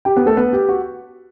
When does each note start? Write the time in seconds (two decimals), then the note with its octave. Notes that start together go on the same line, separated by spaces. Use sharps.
0.05 G4 G5
0.16 B3 B4
0.26 A3 A4
0.37 B3 B4
0.53 G4
0.69 F#4